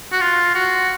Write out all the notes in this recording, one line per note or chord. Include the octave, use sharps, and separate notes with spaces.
F#4
F4
F#4